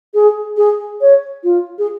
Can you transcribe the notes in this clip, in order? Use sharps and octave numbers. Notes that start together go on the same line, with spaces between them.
G#4
G#4
C#5
F4
G#4